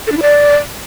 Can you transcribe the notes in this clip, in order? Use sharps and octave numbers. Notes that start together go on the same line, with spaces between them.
A4
D4
E4
D5